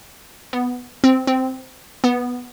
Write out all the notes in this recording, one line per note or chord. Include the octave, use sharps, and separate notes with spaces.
B3
C4
C4
B3